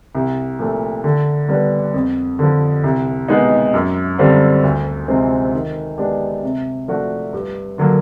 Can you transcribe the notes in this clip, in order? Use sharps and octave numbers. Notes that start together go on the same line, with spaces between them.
C2
A#2 F3 A3
D3
G3 B3 D4
F2
D3 F3
C2
B2 G#3 B3 D#4
F#2
D3 G3 C4 F4
D2
C3 F3 G#3 C4
D#3
G#3 B3 D4 G4
C3
F3 A3 D4 F#4
G2
D3 F#3 A#3